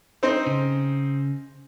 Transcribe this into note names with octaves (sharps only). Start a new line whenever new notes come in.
C4 D#4 C5
C#3